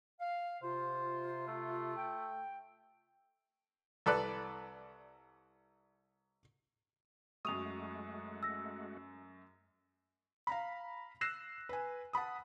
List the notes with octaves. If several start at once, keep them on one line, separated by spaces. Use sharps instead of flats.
F5
C3 F4 C5
A3
G5
C2 A4 B4 D5 F#6
F#2 G#3 A3 F#4 C#6 D#6 F7
E6 A#6
F5 A#5 B5
E6 F#6 A#6 C7 E7
B4 G#5
F#5 A5 B5 D#6